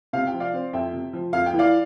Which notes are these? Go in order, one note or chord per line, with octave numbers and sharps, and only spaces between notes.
C3 F5
G5
F3
D5 F5
C4
F2 E5 G5
C3
F3
F2 F5
G5
E3
D5 F5